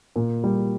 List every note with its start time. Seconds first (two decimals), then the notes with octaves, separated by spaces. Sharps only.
0.16 A#2
0.44 G3